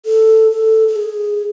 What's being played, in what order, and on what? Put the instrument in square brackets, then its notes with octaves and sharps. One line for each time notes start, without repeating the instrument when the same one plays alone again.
[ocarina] A4
A4
A4
G#4